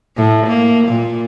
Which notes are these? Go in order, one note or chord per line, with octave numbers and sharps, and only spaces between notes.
A2
A#3
A#2